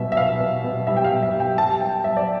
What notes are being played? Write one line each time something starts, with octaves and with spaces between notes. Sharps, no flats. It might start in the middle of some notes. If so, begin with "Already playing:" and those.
Already playing: B2 G3 E5
E5
B2 F5
B2
B2
G3 E5
G5
F5
B2
E5
G3
G5
G3 A5
G3 G5
G3 E5
D5